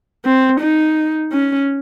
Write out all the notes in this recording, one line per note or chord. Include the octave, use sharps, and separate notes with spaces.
C4
D#4
C#4